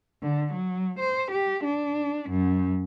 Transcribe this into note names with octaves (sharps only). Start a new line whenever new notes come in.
D3
F#3
C5
G4
D4
F#2